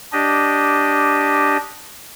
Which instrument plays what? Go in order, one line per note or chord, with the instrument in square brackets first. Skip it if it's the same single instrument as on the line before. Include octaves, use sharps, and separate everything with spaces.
[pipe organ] D4 G4 D#5